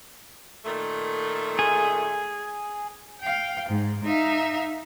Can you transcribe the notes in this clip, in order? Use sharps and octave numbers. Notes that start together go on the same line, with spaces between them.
A#2 D#3 A3
G#4
F5 G5
G#2
D#4 E5 F5